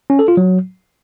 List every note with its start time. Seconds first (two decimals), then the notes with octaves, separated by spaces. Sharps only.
0.10 C#4
0.19 A4
0.28 F4
0.37 F#3